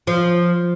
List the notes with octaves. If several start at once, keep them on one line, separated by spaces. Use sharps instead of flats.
F3